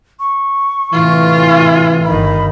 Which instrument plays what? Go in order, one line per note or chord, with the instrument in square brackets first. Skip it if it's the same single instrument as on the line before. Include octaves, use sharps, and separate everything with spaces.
[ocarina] C#6
[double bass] A2 C3 [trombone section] E3 [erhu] F4
[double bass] G1 D#3 [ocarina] B5